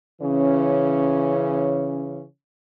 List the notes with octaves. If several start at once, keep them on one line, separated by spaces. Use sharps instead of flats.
C#3 E3 C#4